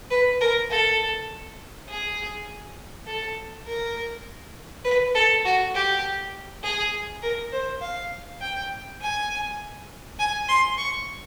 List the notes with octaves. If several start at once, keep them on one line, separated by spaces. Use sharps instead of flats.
B4
A#4
A4
G#4
A4
A#4
B4
A4
F#4
G4
G#4
A#4
C5
F5
G5
G#5
G#5
C6
C#6